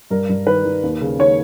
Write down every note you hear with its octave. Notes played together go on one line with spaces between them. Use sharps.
G2 A#4
G2
D#3 B4
D#3
D#2
C#3
D#2 C#5